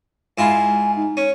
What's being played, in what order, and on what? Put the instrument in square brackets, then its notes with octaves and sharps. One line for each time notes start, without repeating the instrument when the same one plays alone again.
[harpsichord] G#2 E4 F4 [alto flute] G#5
[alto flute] D#4
[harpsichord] C#4